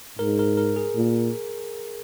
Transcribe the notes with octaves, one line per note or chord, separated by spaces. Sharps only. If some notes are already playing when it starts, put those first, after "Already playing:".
G#2 A#4
A#4
A#4
G#4
A#2